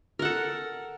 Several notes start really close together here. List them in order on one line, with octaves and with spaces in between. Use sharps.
A#4 F#5 A4